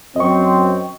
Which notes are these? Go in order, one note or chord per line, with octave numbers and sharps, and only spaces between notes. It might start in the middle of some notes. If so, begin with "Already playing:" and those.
F#2 C4 D#5 C#6